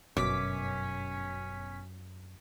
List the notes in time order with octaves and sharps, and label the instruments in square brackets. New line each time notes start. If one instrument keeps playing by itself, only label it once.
[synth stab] G1 B2 B6 [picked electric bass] F#2 [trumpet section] C#4 [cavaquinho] D6